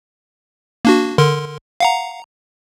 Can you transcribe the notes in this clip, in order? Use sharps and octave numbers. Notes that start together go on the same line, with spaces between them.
A#3 D4 F#4
D3 A#4 C6
F5 F#5 A#5